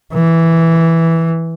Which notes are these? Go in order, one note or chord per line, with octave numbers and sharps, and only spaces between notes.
E3